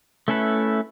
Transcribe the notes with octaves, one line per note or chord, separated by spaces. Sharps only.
A3 C#4 E4 A4 B4